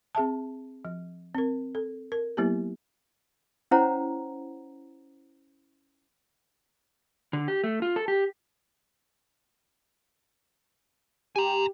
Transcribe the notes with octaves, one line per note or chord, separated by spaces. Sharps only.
C4 G#4 E5 A5
F3
C4 A#4
A4
A#4
F#3 A#3 B3 E4 G4
C#4 E4 C5 C#5 F#5 A#5
D3
G4
A3
F4
A4
G4
G4 G#5 A#5